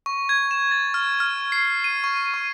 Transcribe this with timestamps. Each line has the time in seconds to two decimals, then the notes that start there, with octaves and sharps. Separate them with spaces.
0.06 C#6
0.29 G#6
0.51 E7
0.71 A6
0.94 F6
1.20 F6
1.52 C7
1.84 D#7
2.04 C#6
2.34 C#6